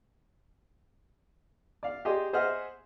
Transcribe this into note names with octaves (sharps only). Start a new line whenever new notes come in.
D5 F5
G4 G#4 D5 D#5 C6
G#4 C5 D#5 E5 F#5 F6